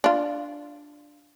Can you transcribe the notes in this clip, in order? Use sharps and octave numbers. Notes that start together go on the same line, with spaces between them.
D4 F4